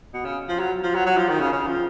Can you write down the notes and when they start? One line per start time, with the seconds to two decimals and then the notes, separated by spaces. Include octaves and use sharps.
0.14 B2
0.25 C#3
0.49 F3
0.59 F#3
0.83 F3
0.95 F#3
1.06 F#3
1.18 F3
1.29 D#3
1.40 C#3
1.52 C#3
1.67 F3